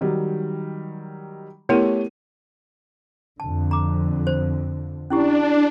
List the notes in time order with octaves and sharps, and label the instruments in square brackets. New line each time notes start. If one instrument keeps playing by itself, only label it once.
[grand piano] D#3 F#3 G3
[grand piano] A3 D#7 [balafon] B3 E4 A#4 [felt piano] G4 C#5
[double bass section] F2 D3 [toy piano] A5
[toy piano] A#5 D6
C5
[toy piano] C#4 E4 G4 [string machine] D4